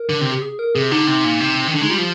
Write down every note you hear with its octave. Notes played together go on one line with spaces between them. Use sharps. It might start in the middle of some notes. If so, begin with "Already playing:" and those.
Already playing: A#4
D3
C3
G4
G#4
A#4
C3 G#4
D3 D#4
C3
A#2
C3
D#3
D3 D4
G#3 D#4
G3 F4
F3 G4